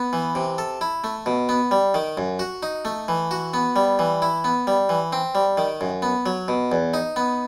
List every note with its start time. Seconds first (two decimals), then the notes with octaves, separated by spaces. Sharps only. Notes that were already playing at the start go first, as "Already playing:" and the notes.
Already playing: B3
0.13 E3
0.35 C3
0.58 A4
0.81 E4
1.04 A3
1.26 B2
1.49 B3
1.71 G3
1.94 D#3
2.17 F#2
2.39 F#4
2.63 D#4
2.85 A3
3.08 E3
3.31 F#4
3.54 B3
3.76 G3
3.99 E3
4.22 E4
4.44 B3
4.67 G3
4.89 E3
5.13 C4
5.35 G3
5.58 D#3
5.81 F#2
6.02 B3
6.26 F#3
6.48 B2
6.72 E2
6.94 D#4
7.16 B3